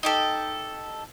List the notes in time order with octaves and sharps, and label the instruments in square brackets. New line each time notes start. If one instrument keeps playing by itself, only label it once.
[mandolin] D#4 G4 A4